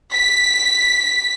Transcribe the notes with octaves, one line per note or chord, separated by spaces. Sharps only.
B6